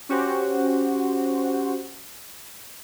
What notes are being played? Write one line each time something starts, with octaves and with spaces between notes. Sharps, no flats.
C#4 F#4 G4 C5